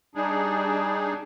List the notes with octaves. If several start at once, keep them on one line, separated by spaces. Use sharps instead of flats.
G3 D4 D#4 G#4